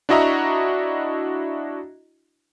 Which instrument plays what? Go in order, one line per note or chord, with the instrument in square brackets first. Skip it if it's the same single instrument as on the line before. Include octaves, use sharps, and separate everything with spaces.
[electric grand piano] D4 E4 F#4 D#5 E5 A#5